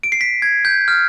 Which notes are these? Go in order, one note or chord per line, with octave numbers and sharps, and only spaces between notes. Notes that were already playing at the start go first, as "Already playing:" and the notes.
D7
C7
B6
G#6
G6
F6